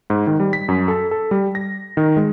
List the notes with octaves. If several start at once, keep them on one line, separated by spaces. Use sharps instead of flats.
G#2
D#3
G3
B6
F#2
A4
A4
G3
A#6
D#3
G#3